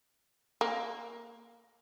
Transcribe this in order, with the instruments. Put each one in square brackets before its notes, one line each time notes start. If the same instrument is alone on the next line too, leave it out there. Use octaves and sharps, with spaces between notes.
[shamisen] A#3